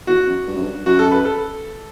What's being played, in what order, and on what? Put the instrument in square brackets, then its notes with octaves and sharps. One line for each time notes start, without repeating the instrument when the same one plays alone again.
[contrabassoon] E2 [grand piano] F#4
[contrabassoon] F#2
G2
F#2
G2
[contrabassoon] F#2 [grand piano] F#4
[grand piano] A4
B4
A4